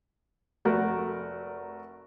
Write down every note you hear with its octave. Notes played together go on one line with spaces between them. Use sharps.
F1 A3 F#4 A#4